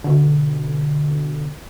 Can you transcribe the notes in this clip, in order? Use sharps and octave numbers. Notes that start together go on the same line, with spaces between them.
B2 D3